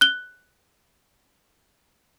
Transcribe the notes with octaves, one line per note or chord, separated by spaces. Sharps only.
F#6 G7